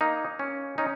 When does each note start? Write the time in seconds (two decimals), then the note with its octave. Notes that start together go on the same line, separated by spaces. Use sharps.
0.01 A#3 D#4
0.39 C#4
0.78 C#4 D#4